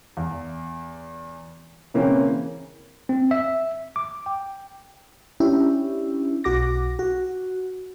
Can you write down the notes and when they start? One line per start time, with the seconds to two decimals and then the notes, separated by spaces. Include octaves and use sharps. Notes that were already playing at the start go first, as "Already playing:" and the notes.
0.17 E2
1.94 C#3 E3 A#3 C4 C#4
3.09 C4
3.31 E5
3.96 D6
4.26 G5
5.40 C#4 D4 E4 G4
6.44 B1 F#4 D6 A#6
6.99 F#4